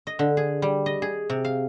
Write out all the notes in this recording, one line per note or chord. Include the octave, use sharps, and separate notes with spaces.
D#5
D3
G#4
G3
D#5
G#4
C3
F5